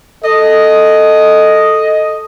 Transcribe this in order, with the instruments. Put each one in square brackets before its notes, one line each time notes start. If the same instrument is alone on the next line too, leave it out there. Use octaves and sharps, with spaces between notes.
[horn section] A4 D#5